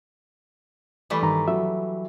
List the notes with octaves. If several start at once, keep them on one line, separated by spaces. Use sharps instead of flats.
E3 G3 A3
G2 D#3 A#5
F#3 E5